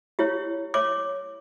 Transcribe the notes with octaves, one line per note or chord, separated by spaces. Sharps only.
E4 G4 C#5
C#5 D6